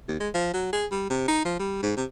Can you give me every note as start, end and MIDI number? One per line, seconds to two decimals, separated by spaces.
0.08 0.17 39
0.20 0.29 56
0.34 0.52 53
0.54 0.68 54
0.73 0.86 68
0.92 1.07 55
1.10 1.27 48
1.28 1.43 63
1.45 1.58 53
1.60 1.78 55
1.83 1.95 44
1.97 2.05 48